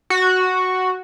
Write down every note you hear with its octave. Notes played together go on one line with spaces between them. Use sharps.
F#4